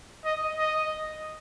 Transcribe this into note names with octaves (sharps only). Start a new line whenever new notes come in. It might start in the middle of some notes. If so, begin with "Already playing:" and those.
D#5
D#5